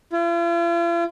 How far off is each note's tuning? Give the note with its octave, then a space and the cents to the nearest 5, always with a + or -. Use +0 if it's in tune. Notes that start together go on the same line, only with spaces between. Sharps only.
F4 -45